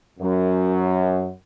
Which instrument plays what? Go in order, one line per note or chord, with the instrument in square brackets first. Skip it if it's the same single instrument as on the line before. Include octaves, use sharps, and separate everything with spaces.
[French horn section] F#2